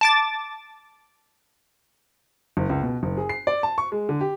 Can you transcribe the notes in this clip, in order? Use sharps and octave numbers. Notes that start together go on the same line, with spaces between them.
A5 D6 A6
F#1
C#2
B2
F#1
G#4
C7
D5
A5
C#6
G#3
D3
G4